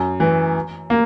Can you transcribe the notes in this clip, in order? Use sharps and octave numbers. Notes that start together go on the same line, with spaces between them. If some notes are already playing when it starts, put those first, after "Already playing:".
Already playing: F#2
E3
A#3